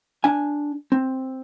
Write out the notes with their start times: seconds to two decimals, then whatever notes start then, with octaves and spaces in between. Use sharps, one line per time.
0.24 D4 G#5
0.92 C4